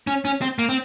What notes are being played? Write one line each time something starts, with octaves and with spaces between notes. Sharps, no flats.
C#4
C#4
C4
A#3
C4